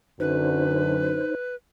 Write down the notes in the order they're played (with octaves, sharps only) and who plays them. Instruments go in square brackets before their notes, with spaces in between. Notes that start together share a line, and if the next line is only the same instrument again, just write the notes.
[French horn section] F#2 D3 [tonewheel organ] D#4 C5 [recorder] B4